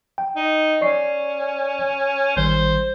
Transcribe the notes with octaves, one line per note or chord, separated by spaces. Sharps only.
G5
D#4
C#4 D5 C#6 C7
A1 D#3 G3 C5